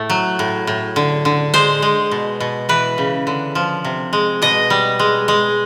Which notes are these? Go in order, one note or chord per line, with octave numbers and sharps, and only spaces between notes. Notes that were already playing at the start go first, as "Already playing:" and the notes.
Already playing: A2 A3
F#3
A2
A2
D3
D3
G#3 C5
G#3
B2
B2
E3 B4
C#3
D3
F3
C3
G#3
B2 D#5
G3
G#3
G#3